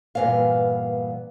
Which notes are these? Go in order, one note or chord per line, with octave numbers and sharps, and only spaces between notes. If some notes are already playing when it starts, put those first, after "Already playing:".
G2 A#2 E3 B3 F5